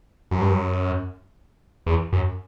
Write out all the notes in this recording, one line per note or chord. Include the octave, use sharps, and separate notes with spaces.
F#2
G2
F#2
E2
F#2